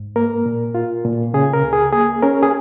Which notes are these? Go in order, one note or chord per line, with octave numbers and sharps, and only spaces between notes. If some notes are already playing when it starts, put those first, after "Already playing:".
Already playing: G#2
A#3 A#4
A#2
F4
A#2
C#3 G#4
A#4
C#2
G#4
A#3 G#4
C#4 A#4
G#4